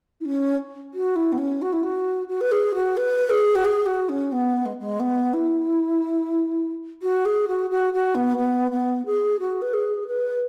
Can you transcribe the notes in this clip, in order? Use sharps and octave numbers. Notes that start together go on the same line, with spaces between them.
E4
C#4
F#4
E4
B3
C#4
F#4
E4
F#4
F#4
B4
G#4
F#4
B4
G#4
F#4
G#4
F#4
C#4
B3
G#3
G#3
B3
E4
F#4
G#4
F#4
F#4
F#4
B3
B3
B3
G#4
F#4
B4
G#4
B4